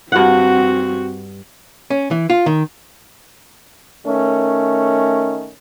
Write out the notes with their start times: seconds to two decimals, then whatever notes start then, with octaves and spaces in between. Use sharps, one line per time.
0.12 G2 C4 F#4 F#5
1.90 C#4
2.11 E3
2.30 F4
2.46 D#3
4.06 D#3 A3 C#4 A#4